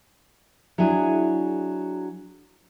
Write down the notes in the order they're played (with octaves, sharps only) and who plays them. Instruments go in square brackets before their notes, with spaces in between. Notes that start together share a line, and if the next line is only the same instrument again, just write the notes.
[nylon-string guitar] F#3 D4 E4 G#4